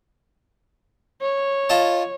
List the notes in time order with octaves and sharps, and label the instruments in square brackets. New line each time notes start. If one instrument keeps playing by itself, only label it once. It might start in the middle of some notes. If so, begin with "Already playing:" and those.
[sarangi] C#5
[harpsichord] F4 D#5 A5